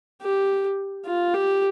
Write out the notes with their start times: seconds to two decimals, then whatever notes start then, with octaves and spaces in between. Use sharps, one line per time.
0.21 G4
1.05 F4
1.34 G4